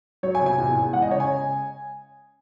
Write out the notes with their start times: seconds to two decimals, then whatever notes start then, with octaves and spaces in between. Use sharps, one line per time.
0.23 F#3 C#5
0.35 G#5
0.41 C3
0.46 G#5
0.58 E2
0.76 E2
0.93 G#3 F#5
1.02 D#5
1.11 C#3 C#5
1.20 G#5